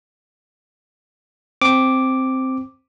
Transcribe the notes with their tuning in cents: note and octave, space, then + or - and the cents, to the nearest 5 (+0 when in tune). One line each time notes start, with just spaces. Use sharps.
C4 +0 D6 +0